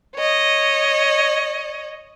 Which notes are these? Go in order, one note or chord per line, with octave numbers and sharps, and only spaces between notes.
C#5 D#5